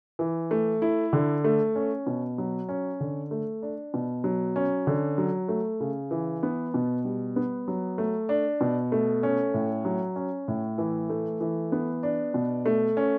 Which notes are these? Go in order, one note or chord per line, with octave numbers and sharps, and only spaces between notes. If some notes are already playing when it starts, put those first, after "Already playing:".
E3
A3
E4
D3
A3
C#4
B2
F#3
C#4
D3
A3
D4
B2
F#3
C#4
D3
F#3
A3
C#3
E3
B3
B2
G3
B3
F#3
A3
D4
B2
A3
C#4
A2
F#3
C#4
A2
E3
A3
E3
B3
D4
B2
A3
C#4